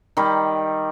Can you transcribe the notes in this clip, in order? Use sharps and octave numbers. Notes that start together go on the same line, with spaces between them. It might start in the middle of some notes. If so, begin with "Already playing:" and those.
D#3 G3